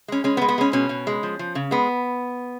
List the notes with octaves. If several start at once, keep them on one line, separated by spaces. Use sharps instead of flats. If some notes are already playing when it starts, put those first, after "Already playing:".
G#3 C#4
G#3 C#4
B3
G#3
B3
G#3 C#4
B2 C#4
B2
G#3
F3
F3
C#3
G#3 B3